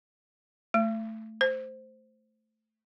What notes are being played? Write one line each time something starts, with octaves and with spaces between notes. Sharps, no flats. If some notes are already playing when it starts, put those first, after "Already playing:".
A3
C5